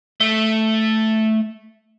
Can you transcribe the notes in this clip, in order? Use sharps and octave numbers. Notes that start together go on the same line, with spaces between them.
A3